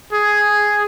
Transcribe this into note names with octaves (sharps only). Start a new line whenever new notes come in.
G#4